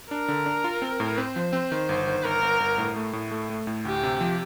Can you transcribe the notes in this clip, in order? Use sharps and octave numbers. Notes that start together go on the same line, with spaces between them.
D4 A#4
D3
D4
F4
C4
A2
C4 C5
F3
C4
D#3
G1
D#3
G1 A#4
G1
G1
A2
A3
A2
A3
A3
A2
D2 G4
C3
F3